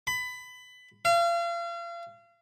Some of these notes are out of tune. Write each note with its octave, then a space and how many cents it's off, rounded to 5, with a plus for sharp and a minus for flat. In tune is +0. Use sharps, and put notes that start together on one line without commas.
B5 +20
F5 -35